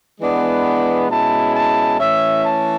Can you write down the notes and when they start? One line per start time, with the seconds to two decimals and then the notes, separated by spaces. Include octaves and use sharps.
0.20 E3 G#3 B3 D4
1.09 B2 G#3 C#4 E4 A5
1.54 A5
1.99 E3 A3 C#4 E5
2.44 A5